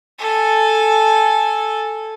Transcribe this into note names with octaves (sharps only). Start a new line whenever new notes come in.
A4 G#5